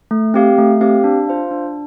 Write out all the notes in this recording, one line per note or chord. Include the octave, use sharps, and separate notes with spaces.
A3
C4 G4 F5
A3
C4 G4 F5
D4
F4 C5 F5
D4